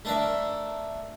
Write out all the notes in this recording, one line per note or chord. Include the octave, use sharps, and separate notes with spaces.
A3 D4 A#4 E5